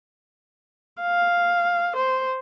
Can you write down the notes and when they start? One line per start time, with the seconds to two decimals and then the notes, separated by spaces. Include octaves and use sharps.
1.02 F5
1.96 C5